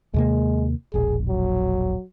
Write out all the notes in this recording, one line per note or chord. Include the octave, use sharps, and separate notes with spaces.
D#2 C3 G#3 A#3
E1 A#1 G#4
F#3